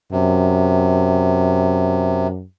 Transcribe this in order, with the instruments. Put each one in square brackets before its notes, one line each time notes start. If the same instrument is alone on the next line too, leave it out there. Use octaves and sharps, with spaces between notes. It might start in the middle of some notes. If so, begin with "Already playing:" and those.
[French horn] F#2 [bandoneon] C3